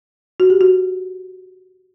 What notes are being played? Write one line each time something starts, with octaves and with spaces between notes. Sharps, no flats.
F#4
G4
F#4